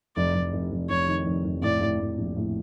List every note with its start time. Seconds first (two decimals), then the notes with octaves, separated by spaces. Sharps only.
0.16 F1 D5
0.35 F1
0.53 F1
0.72 F1
0.90 F1 C#5
1.08 D#3
1.26 F1
1.44 F1
1.62 A2 D5
1.81 A2
2.00 A2
2.18 A#1
2.36 A2